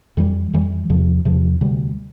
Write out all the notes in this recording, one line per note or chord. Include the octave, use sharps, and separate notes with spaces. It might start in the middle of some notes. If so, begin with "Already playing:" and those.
F2 E3 G3
F2 E3 G3
E2 C3 F3
E2 C3 F3
D2 C3 G3